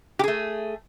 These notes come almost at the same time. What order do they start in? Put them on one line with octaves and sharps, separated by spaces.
G4 G#4 A3